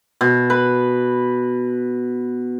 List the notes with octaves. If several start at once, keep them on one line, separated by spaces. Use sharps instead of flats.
B2
B4